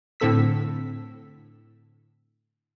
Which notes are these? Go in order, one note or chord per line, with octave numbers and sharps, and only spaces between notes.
A2 D3 C4 A4 E6 B6